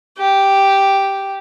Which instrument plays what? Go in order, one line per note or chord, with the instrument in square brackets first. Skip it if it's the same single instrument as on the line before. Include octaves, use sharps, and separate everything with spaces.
[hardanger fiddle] G4